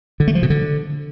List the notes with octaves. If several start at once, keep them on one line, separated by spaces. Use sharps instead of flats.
D3
A3
F3
B2
D3